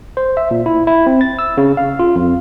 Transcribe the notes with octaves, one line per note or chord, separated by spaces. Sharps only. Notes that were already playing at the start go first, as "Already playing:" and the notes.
C5
E5
A#2
E4
E4
C4
A6
E6
C#3
F5
F4
F2